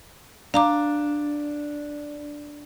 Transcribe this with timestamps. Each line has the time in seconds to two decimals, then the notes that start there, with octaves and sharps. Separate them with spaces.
0.54 D4 F5 A#5 D6